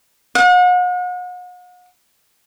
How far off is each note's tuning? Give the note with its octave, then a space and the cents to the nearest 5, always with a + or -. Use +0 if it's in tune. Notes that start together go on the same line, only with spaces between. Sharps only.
F#5 -40